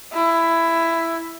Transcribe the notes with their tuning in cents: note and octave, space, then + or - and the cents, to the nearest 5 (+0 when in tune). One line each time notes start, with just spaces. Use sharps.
E4 +10